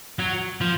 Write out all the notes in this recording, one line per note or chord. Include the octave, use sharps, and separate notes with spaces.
F#3
F3